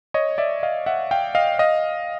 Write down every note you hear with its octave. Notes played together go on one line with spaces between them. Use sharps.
C#5 D#5
D5 E5
D#5 F5
E5 F#5
F5 G5
D#5 F5
D#5 F5